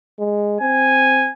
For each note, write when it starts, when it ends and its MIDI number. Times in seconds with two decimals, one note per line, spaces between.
0.19 0.59 56
0.61 1.29 60
0.61 1.32 80